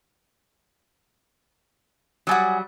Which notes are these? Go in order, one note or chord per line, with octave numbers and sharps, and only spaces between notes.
F#3 G3 F#5 G#5 D#6